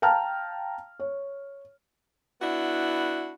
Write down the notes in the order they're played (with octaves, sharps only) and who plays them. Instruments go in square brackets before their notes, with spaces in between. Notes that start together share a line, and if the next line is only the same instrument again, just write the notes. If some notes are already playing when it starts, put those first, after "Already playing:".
[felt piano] F5 G5 A5 A#5 F6
C#5
[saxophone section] B3 D4 E4 F#4